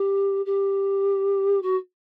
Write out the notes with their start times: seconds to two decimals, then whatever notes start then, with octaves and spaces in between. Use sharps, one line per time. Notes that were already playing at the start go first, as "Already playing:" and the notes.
Already playing: G4
0.45 G4
1.62 F#4